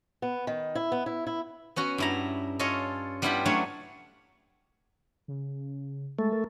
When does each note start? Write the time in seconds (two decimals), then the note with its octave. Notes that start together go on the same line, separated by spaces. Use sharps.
0.22 B3
0.47 D#3
0.75 E4
0.92 B3
1.06 E4
1.27 E4
1.76 B3 C#4 F#4
1.98 G2 E4 A#5
2.59 C#4 F4 A4 C#5 D#5
3.22 G3 B3 D4 E4 F4 G4
3.45 F#3 A3 C#4 D4 C#5
5.28 C#3
6.19 G#3 A3
6.32 A#4